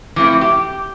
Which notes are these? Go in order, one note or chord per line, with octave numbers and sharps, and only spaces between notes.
E3 F3 A3 C4 E4
G4